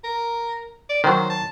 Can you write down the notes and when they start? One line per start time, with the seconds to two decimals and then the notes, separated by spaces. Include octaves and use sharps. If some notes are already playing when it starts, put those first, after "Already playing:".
0.04 A#4
0.90 D5
1.04 D#3 F#3 C5
1.30 A5